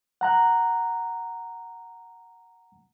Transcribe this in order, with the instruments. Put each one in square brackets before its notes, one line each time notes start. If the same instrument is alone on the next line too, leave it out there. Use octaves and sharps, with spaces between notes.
[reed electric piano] F#5 A#5 F#6